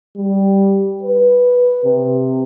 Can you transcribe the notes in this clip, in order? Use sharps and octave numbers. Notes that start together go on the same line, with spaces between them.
G3
B4
C3